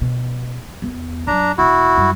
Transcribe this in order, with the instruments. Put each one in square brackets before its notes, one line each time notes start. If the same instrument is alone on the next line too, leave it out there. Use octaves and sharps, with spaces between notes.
[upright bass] B2
E2 B3
[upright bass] F#2 F#3 [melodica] D4 A#5
[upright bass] E1 B1 [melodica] E4 F#4
[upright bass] F#2 G3